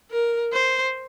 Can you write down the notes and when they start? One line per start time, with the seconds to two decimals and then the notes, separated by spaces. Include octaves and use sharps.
0.11 A#4
0.53 C5